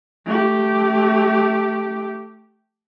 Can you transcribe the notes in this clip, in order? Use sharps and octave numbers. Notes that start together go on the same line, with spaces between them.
A3 G4